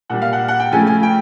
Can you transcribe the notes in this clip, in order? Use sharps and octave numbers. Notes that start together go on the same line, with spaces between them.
A#2 G3 F#5
F5
F#5
F#5
G5
C#3 F3 A3 G#5
G#5
G5